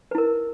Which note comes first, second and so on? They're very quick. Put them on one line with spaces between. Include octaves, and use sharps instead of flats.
B4 E4 A#4